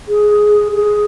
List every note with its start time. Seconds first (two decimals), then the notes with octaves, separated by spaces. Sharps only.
0.08 G#4
0.74 G#4